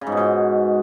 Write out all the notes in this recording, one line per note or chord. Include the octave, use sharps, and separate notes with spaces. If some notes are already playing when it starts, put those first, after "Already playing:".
C#3
G#2
B2
G#2